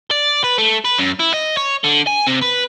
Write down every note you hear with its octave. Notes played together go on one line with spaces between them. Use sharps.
D5
B4
A3
B4
F#2
E4
D#5
C#5
D3
G#5
C3
B4